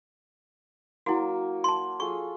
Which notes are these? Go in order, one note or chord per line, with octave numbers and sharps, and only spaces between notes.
F#3 A#3 E4 F#4
A5 C6
F4 G#4 A4 C#6